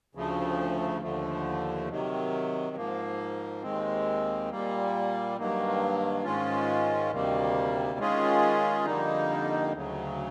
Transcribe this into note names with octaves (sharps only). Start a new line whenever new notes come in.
D2 C#3 F3 A3
D#2 D3 F3 A3
C3 D#3 F#3
G#2 F3 A#3
D#2 D#3 G#3 C4
A#2 G3 A#3
G2 D#3 F#3 A#3
G#2 D#3 G#3 C#4 F4
D2 C3 D#3 G3 A#3
D#3 G#3 C#4 F4 G#4
F2 D3 G3 A#3 D#4
D2 C#3 F#3